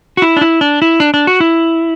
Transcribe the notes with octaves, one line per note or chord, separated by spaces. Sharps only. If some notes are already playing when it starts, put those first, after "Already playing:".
F#4
E4
D4
E4
D4
E4
D4
D4
F#4
E4